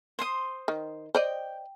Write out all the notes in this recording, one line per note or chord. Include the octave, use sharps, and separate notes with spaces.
C5 C6 D#6
D#3
C5 D5 D#5 G5